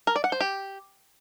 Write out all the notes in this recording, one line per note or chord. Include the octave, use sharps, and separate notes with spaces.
A#4
D5
F#5
C5
G4